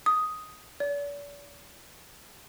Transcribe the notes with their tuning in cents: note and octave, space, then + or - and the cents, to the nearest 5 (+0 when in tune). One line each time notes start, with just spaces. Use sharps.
D#6 +5
D5 -40